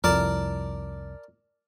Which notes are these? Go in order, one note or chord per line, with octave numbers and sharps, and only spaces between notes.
C2 F2 A#4 D5 A5